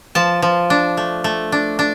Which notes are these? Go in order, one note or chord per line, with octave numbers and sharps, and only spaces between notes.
F3 A5
F3
D4
A3
A3
D4
D4